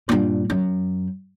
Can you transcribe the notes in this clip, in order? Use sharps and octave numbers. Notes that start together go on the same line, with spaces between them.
G2 A#2
F#2